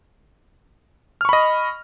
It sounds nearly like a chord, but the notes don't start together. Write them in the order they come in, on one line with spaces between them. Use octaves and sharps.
F6 C#6 B5 D#5